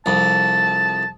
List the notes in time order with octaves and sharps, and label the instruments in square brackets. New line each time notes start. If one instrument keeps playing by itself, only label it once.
[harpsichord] C2 F2 [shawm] A5